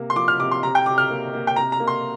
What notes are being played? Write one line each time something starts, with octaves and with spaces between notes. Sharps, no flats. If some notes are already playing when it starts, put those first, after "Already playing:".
Already playing: C3 A#3
C6
F3 D6
F6
C3 D6
C6
C3 A#5
G5
C3 D6
F6
A#3
A#3
G5
C3 A#5
A#5
A#3
C6